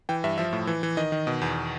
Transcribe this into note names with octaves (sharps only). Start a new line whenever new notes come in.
E3 G5
G2 E5
F3 E5
A2
E3
E3
D#3 D#5
D#3
B2
E2